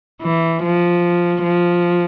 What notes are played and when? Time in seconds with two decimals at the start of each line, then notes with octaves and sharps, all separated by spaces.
0.22 E3
0.63 F3
1.44 F3